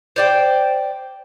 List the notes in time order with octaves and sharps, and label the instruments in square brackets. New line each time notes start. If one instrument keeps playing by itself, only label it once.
[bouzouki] C5 D5 G5